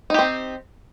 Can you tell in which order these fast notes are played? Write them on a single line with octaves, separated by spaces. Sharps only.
D#4 G4 C4